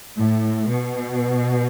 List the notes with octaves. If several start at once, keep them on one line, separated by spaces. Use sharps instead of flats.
A2
B2